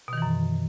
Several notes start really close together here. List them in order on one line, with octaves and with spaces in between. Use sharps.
B2 D#3 E3 F#2